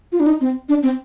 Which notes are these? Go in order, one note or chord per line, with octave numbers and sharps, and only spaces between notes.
F4
D4
D#4
C4
D4
C4